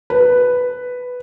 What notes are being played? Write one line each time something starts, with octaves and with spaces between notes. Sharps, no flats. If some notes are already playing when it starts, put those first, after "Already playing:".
B4